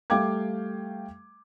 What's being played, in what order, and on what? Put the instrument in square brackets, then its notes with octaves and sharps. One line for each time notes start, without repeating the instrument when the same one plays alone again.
[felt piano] G3 A3 F5 G5 D6 G#6